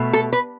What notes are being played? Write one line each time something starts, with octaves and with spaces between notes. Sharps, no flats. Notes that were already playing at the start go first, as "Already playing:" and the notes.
Already playing: B2 A3
A4
B4